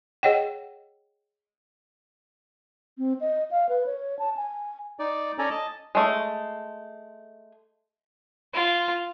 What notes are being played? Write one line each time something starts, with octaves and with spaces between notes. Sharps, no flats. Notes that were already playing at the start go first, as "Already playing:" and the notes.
G#4 C#5 D#5 F#5 G5
C4
D#5
F5
B4
C#5
A5
G#5
D#4 D5
C#4 A4 D5 G#5 A#5
D#5 A5
G#3 A3
F4